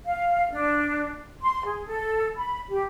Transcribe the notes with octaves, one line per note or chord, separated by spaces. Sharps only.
F5
D4
C6
G#4
A4
B5
G4